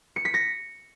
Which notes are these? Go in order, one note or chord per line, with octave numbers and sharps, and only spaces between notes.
C#7
B6
A#6